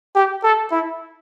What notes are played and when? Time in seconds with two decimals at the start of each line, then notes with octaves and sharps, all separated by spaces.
0.16 G4
0.44 A4
0.71 E4